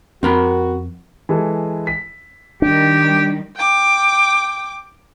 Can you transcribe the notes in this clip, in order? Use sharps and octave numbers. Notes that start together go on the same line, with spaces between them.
F2 C4 F#4 A#4 B5
E3 G#3 A4
B6
D#3 G3 D4 G4
G5 D6